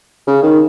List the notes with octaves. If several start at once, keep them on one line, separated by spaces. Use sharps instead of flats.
C#3
D#3